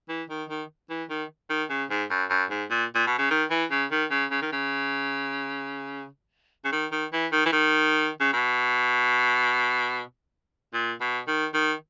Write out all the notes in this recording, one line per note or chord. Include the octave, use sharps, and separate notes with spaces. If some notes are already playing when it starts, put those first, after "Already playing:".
E3
D#3
D#3
E3
D#3
D#3
C#3
G#2
F#2
F#2
G#2
A#2
A#2
B2
C#3
D#3
E3
C#3
D#3
C#3
C#3
D#3
C#3
C#3
D#3
D#3
E3
D#3
E3
D#3
C#3
B2
A#2
B2
D#3
D#3